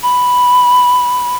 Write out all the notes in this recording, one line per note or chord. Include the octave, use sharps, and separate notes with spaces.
B5